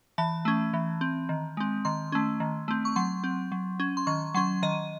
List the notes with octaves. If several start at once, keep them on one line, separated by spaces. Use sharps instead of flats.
E3 A5
A3 C#4
E3
C4
D#3
G#3 C4
D#3 C6
A3 C#4
D#3
A3 C4
C#6
F#3 C6
C4
F#3
C#4
C6
D#3 C#6
F#3 C#4 C6
D#3 D#5